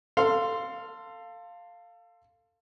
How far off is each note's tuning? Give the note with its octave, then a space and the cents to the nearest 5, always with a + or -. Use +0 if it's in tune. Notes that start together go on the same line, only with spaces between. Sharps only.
A4 +25 F5 +0 C6 -5